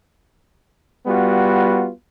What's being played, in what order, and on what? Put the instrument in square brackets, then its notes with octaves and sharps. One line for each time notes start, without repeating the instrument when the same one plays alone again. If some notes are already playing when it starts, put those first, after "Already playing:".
[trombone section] G3 B3 F4 F#4